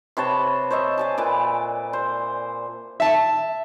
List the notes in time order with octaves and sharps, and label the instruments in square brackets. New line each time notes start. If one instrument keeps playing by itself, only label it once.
[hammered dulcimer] C3 B4 C#5 A5
C5 C#5 D#5 E5
D5 G#5 A5
A#2 B4 D5
C5
[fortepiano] E5 A5